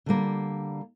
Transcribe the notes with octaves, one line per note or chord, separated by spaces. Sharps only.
D3 G3 A#3